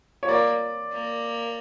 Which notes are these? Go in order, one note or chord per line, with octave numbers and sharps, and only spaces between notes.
C#5
A#3 D5
A#3